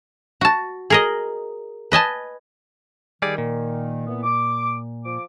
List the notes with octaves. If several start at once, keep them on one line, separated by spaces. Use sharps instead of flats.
F#4 A5
G#4 A#4 D#5
B4 D#5 G#5 A5
D#3 G3 G#4 D5
A#2
E3 B3
D6
F3 D6